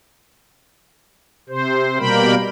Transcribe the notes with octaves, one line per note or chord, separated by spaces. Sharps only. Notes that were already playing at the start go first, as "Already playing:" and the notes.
C3 C5
B2 G3 A#3 A#4 G5 B5